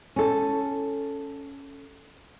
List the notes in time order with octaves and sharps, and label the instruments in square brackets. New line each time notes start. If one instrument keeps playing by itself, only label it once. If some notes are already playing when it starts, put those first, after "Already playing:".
[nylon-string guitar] C#4 A4